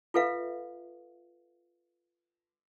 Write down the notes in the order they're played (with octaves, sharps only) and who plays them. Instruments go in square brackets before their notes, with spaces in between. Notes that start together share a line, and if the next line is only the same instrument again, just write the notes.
[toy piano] F4 A4 B4 E5 F5